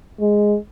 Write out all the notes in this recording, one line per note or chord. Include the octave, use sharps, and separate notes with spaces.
G#3